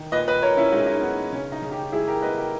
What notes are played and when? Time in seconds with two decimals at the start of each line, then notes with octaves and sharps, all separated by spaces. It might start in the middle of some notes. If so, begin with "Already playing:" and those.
Already playing: D#3
0.12 A#2 B4 D#5
0.27 B4 D#5
0.42 A#2 A#4 C#5
0.57 C#4 E4
0.72 G#3 D#4
0.79 E4
0.86 D#4
1.02 B3
1.32 C#3 C#4
1.52 D#4
1.62 C#3
1.72 D#4 G4
1.92 G#3 E4 G#4
2.07 G4 A#4
2.22 B3 B4 D#5
2.37 G4 A#4